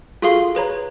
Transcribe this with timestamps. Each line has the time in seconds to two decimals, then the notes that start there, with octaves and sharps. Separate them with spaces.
0.22 F4 F#4 G#4 A4 F5 C6
0.55 G#4 B4 C#5 A#5